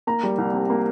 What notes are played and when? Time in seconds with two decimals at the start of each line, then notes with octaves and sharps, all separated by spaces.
0.07 A#3 A#5
0.23 G3
0.38 C2
0.53 C3
0.70 A#3